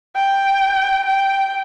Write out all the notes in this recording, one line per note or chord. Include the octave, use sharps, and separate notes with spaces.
G5
G5